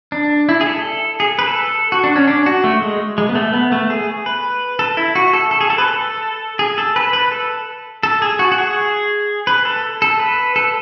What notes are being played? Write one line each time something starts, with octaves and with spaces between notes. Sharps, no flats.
D4
E4
G#4
A4
G#4
B4
A4
F#4
D4
C#4
D4
F#4
A3
G#3
G#3
B3
A3
B3
A3
G#4
B4
A4
E4
F#4
A4
A4
G#4
A4
B4
A4
G#4
A4
B4
B4
A4
A4
G#4
F#4
F#4
G#4
B4
A4
A4
B4
A4